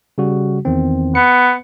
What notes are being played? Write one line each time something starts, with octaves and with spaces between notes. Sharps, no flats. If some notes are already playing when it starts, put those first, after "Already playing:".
C#3 G3 F#4
E2 D#3 C4
B3 C#7